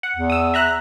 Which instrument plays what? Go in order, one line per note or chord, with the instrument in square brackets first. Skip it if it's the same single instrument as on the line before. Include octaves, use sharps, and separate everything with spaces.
[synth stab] F#5
[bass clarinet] E2
[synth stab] D#6 E6
E5 A#5 F#6